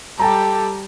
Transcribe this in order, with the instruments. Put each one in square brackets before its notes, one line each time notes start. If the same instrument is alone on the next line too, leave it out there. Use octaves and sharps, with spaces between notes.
[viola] G3 G4 [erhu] A4 [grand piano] G5 A5 A#5